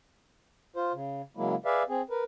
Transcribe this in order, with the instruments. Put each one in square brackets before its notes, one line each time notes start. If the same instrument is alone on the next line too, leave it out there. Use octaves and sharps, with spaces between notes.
[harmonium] F4 C5
C#3
C#3 F#3 G#3 A#3 E4
G#4 B4 D5 E5 F5
C4 G#4
A#4 B4